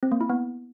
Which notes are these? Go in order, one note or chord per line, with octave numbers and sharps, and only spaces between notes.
C4
A#3
E4
B3